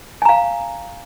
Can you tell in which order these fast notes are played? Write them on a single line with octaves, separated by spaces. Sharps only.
G#5 A#5 F5